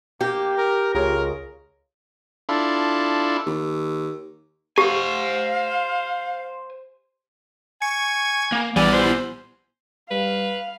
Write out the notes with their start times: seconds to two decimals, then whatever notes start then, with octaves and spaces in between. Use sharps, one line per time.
0.21 A#3 G4
0.58 A#4
0.94 C#2 F4 G#4 A#4 C#5
2.49 D4 E4 F4 A4
3.46 D#2
4.78 G4 C5 F5 G#5
7.82 G#5 C#6
8.52 A#3
8.76 A#1 E3 G3 B3 D5 G#5
8.93 C5
10.11 G3 B4 F5